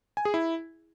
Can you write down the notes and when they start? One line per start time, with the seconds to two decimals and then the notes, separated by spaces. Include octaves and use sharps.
0.17 G#5
0.25 G#4
0.34 E4